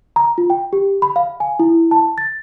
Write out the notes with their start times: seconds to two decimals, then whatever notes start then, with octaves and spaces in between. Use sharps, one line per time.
0.16 A#5
0.38 F4
0.50 G5
0.73 G4
1.02 B5
1.16 F5
1.40 G#5
1.59 E4
1.91 A5
2.18 A6